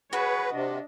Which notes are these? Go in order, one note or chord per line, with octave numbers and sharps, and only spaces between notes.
F#4 G#4 B4 C#5
C3 D4 D#5